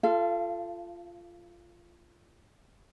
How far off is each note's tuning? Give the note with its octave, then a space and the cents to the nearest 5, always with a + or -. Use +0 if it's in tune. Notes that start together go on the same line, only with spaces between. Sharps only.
F4 -10 A4 +0 F5 -35